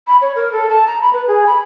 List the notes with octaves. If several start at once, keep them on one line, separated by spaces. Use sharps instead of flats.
B5
C#5
A#4
A4
A5
A#5
B5
B4
G#4
B5